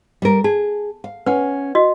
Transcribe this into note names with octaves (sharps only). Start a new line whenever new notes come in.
G3 A#4
G#4 A5
F5
C#4 B4 F#5
F#4 D#5